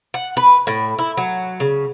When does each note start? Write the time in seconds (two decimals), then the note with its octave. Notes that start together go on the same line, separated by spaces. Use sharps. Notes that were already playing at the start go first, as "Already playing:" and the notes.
0.14 F#5
0.37 B4
0.67 A2
0.99 E4
1.17 F#3
1.60 C#3